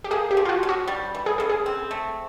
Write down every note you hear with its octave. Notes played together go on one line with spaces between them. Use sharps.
G4
A#3 G#4
G4
F3
F4
F#4
C#3
F#4
G3
E3
G#4
C#3 A4
G#4
C4
A3